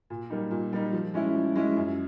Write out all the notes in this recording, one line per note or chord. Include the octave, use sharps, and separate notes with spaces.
A#2
G3 A#3 D#4
A#2
G3 A#3 D#4
F3
G#3 C#4 E4
F3
G#3 C#4 E4
F#2